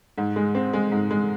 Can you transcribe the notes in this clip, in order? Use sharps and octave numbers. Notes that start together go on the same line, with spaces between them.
G#2
G#3
C4
G#3
G#2
G#3